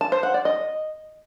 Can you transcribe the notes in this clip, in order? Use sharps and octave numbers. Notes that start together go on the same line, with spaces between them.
A5
C5
F#5
D5
D#5